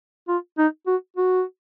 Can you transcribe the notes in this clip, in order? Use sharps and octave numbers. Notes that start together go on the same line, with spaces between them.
F4
D#4
F#4
F#4